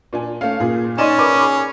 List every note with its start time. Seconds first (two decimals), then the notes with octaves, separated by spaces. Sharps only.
0.13 A#2 D4 G#5
0.41 A3 C#4 F5
0.60 A#2 G#4
0.98 C#4 D#4 D5 C6 D#7 E7
1.18 A#4 B4 D5 B5 D6
1.41 G#4